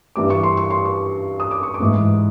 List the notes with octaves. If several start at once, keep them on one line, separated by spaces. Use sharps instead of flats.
G2 E3 G3 D6
C#6
C6
C#6
C6
C#6
D#6
D6
C#6
D6
G#2 E3 G#3